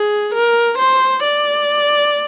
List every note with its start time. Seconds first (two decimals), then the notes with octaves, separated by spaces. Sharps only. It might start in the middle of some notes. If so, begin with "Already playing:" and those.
Already playing: G#4
0.34 A#4
0.78 C5
1.22 D5